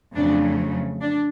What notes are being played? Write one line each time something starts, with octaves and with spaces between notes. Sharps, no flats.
F2 C#3 F#3 A3 D4
D4